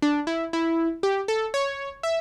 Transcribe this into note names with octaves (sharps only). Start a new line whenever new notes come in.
D4
E4
E4
G4
A4
C#5
E5